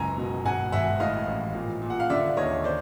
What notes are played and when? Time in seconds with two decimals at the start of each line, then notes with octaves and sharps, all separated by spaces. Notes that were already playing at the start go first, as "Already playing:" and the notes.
Already playing: F#1 C#2 G#5 A#5
0.18 B2
0.44 G#1 F#5 G#5
0.72 G#1 E5 F#5
1.00 A2 D#5 F5
1.27 A1
1.55 A#2
1.82 A#2
1.90 F#5
2.00 F5
2.10 D3 D5 E5
2.37 D#2 C#5 D#5
2.64 C5 D5